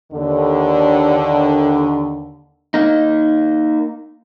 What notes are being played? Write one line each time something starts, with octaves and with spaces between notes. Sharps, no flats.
D#2 D3
A#3 D#4